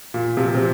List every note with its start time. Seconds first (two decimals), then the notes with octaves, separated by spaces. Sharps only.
0.14 A#2
0.37 C3 F3
0.55 C3